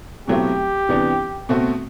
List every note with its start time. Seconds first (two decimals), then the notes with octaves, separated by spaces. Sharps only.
0.28 B2 F#3 A3 C4 E4 G4
0.89 C3 E3 B3 D4
1.49 B2 A3 C4 F#4